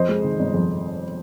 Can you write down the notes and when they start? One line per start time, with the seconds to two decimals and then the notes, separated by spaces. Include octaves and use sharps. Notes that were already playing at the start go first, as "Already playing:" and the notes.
Already playing: F2 C5 D#5
0.09 G#3
0.24 D#3
0.39 G1
0.54 F2